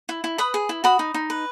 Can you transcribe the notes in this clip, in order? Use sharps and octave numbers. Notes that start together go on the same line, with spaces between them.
E4
E4
B4 B5 D#6
G#4
E4
F#4 B5 D#6
D#4
D#4
B4